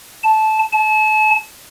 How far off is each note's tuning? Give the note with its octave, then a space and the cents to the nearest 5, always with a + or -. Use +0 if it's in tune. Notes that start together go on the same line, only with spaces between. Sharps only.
A5 -15
A5 -35